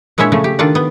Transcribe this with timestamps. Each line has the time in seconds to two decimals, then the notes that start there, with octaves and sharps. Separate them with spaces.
0.18 A#2 G#3 D4 E4 C#5 E5
0.32 C#3 F3 A3
0.44 G4
0.59 D#3 D4 F4 A4 D5
0.75 B3